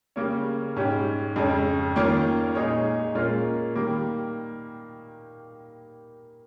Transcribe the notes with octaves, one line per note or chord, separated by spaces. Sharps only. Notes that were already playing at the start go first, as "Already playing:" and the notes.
C#3 G3 A#3 C#4
G#2 G3 C#4 G4
F2 C#3 G#3 C#4
D#3 A#3 C#4 F4 A#4
A#2 G#3 D#4 G#4 C#5
A#2 G#3 C#4 F4 A#4
D#3 G3 A#3